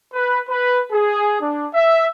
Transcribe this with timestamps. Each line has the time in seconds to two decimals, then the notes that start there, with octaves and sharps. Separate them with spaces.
0.13 B4
0.50 B4
0.91 G#4
1.40 D4
1.74 E5